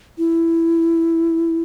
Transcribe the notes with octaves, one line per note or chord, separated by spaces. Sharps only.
E4